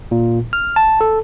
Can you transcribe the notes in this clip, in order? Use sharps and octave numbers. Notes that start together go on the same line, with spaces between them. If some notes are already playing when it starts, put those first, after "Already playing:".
A#2
F6
A5
A4